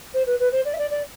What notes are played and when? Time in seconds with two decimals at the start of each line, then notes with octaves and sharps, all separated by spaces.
0.14 C5
0.26 B4
0.39 B4
0.52 C5
0.65 D5
0.74 E5
0.78 D5
0.90 D5